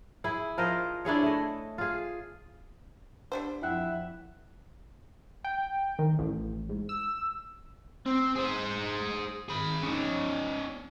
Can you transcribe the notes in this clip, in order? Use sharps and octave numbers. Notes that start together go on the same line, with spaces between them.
E4 G#4
F3 A#4 C5 D#5
D4 E4 G#4 C#5
A3 D#5
F4 G#4
G3 D4 C5
F2 E4 E5 F#5 G5 F#6
G5
D#3
A1
G#2
E6
C4
G#4 C5
G#4 B5
C#4 D#4